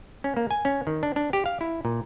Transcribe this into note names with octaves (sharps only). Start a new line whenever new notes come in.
C#4
A#3
G#5
C#4
D#3
D4
D4
G4
F5
E4
A#2